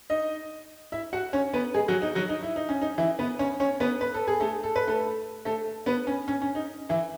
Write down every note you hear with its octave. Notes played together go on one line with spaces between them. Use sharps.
D#4 D#5
E4 E5
F#4 F#5
C#4 C#5
B3 B4
G#3 G#4
F#3 F#4
D#4
F#3 F#4
D#4
E4
D#4
C#4
D#4
E3 E4
B3 B4
C#4 C#5
C#4 C#5
B3 B4
B4
A4
G#4
A3 A4
A4
B4
A3 A4
A3 A4
B3 B4
C#4
C#4
C#4
D#4
E3 E4